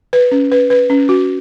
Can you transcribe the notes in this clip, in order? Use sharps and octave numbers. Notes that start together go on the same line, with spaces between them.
B4
C#4
B4
B4
C#4
F#4